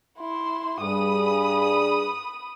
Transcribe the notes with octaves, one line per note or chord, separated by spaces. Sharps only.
E4 C6
G2 G#4 B5 D#6